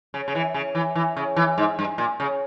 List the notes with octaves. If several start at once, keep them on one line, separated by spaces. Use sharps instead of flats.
C#3
C#3
E3
C#3
E3
E3
C#3
E3
G#2
G2
A#2
C#3